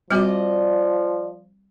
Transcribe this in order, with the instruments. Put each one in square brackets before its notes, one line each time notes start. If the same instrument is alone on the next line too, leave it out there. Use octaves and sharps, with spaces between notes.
[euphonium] F3 [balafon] G3 C4 F#4 [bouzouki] D5 D#5